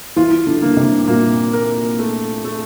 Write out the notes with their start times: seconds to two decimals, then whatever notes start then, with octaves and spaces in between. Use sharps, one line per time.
0.16 E3 F4
0.47 D3
0.62 D3 A#3
0.77 C3
1.08 A#2 A#3
1.53 A#4
1.99 A3
2.45 A3